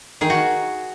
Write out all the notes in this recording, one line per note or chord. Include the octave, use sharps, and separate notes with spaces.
D#3 G#4
F#4